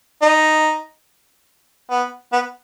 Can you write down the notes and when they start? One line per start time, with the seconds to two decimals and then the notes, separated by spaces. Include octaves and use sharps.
0.22 D#4
1.90 B3
2.32 B3